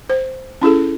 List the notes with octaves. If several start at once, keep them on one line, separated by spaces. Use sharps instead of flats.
C5
C#4 E4 G#4 A4